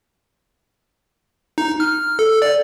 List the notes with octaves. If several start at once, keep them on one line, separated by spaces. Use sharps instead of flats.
D#4
F6
A4
D5